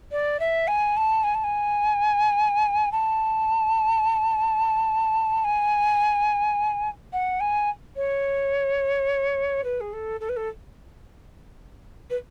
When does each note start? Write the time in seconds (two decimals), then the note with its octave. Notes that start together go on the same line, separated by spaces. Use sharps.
0.11 D5
0.40 E5
0.67 G#5
0.96 A5
1.23 G#5
1.34 A5
1.44 G#5
2.92 A5
5.44 G#5
7.13 F#5
7.40 G#5
7.96 C#5
9.64 B4
9.80 G#4
9.93 A4
10.20 A4
10.29 B4
10.36 A4
12.10 B4